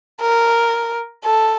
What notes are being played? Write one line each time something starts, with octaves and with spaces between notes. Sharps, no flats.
A#4
A4